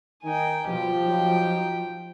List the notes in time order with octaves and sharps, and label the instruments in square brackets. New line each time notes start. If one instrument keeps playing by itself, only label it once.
[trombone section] D#3 D#4 [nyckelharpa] G5 G#5
[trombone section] B2 G3 [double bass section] F3 [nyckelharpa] G4 G5
[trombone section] F#3 D#4